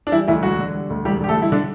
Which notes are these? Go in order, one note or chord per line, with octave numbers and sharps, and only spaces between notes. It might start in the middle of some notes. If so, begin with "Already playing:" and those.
D4
E3 G3 E4
D2 E3 E4
E1 F#3 F#4
D3
G3
D2
E1 G3 G4
D3 G4
A3 A4
G3 E4
D3 D4